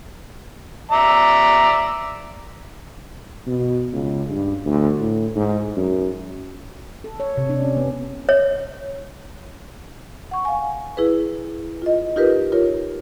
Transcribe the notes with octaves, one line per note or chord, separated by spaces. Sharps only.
D5 E5 A#5
B2
C#2
G2
D2
A2
G#2
F#2
A4
C#5
C3
D4
C#4
B3
C#5
F#5 C#6
F5 G#5
E4 G#4 B4
F4 D#5
D#4 F4 G4 A#4 B4
F4 A#4 C#5